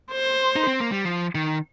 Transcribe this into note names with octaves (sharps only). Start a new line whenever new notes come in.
C5
D#4
C4
A#3
G3
F3
D#3